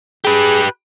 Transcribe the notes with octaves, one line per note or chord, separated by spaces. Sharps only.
G4 G#4 B4